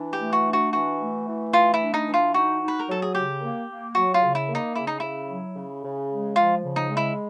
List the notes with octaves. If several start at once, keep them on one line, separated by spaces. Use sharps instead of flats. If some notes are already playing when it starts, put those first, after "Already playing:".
Already playing: E3 D4
G4
A3
F#4
D4
F#4
E3 F#4
A3
E3
A3 F4
E4
D4
D#4
E3
F4
D#4 F#4
D#4
B4
A#4
F#3 A4
G#4
C#3 G4
A#3
A#3
F#3 F#4
F4
C#3
E4
A#3
D#4
C#3 E4
D#4
C#3 E4
F#3
C#3
C#3
G#3
F3 F4
C#3
D#4
G#3
E4